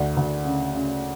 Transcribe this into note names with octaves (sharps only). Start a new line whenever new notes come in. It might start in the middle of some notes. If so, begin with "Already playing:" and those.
Already playing: D2 D5
D2
C#3
C#3